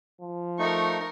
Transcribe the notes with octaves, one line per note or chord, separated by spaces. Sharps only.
F3
A3 D#4 A#4 C#6